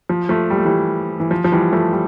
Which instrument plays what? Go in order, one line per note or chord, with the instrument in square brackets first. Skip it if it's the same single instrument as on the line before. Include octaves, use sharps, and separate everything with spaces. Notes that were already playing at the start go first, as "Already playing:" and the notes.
[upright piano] F3
F3 A3
G3
A3
E3 G3
E3
F3
F3
E3 G3
F3 A3
G3